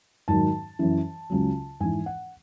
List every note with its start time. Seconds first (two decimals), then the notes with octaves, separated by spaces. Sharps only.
0.28 G#2 D#3 F#3 A5
0.79 F#2 E3
1.30 C#2 C#3 F#3
1.80 G#2 E3 G#5
2.06 F#5